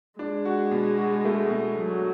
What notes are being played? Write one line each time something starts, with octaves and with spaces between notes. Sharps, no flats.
G#3 D4
F#4
B2
F#4
A3
B2
B2 F#3